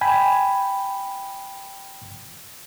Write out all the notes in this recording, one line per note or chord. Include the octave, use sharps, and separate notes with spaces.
G5 G#5 B5